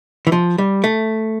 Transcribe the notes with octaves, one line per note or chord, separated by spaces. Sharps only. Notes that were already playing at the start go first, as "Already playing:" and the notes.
E3
F3
G3
A3